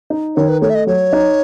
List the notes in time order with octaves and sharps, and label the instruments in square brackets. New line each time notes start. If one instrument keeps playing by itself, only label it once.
[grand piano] D#4
[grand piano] D#3 [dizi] C#5
[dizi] B4
[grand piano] A3 [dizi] C#5
[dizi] E5
D#5
[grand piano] F#3 [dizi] C#5
[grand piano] D#4